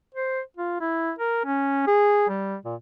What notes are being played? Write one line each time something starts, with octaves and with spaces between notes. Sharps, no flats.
C5
F4
E4
A#4
C#4
G#4
G3
A#2